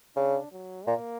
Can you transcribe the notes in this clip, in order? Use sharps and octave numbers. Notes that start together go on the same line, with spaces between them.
C#3 D4
F#3
A#2 A#3